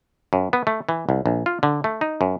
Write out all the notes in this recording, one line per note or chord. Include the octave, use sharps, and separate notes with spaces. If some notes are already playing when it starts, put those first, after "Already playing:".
F#2
B3
A3
E3
C2
A#1
F4
D3
A3
D#4
F#2